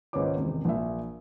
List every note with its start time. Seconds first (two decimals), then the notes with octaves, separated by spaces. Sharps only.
0.13 C#2 G#2 D#3 B4 C#5 D6
0.37 G#1 E2 C3
0.65 A#1 E5